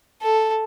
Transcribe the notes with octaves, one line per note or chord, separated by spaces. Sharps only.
A4